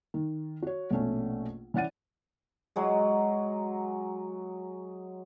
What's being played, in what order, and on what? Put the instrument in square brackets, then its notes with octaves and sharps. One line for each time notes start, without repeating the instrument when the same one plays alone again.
[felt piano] D#3
F#4 C#5
A#1 B2 A3 C#4
E3 C#4 D5 F#5 A6 D#7
[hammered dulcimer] F#3 G#3 G#4